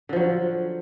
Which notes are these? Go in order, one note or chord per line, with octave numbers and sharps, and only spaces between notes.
D3 F3 F#3